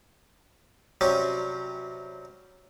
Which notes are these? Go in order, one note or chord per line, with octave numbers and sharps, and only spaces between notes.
C3 F#3 G3 C#4